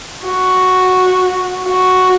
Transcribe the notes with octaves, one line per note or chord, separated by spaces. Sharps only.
F#4
F#4